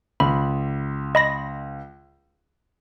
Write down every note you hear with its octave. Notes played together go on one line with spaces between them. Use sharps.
C#2 B5
D#5 B5 A#6